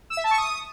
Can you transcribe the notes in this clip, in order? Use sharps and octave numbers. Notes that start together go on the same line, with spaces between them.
E6
E5
A5
C#6
D#6